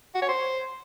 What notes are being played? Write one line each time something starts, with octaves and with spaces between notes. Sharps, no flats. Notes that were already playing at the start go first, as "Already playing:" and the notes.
F#4
C#5
C5